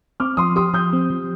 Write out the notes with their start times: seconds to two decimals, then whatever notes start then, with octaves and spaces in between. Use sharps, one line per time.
0.20 C4 D6 F6
0.37 F3 C6 D#6
0.56 G4 C6 D#6
0.74 F3 D#6 G6
0.93 C4
1.10 F3